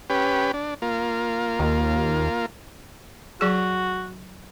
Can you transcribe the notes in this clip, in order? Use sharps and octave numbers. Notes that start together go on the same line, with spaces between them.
C#4 G4 B4
D4
A#3 F4
D#2
F#3 F#4 G#4